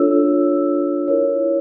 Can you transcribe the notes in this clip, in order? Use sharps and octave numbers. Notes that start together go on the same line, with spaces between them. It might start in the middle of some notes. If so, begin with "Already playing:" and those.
Already playing: D4 F4 A4 C#5 E6
E4 A#4 C#5